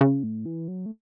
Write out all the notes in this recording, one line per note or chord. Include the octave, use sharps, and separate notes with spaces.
C#3
A2
E3
F#3
A3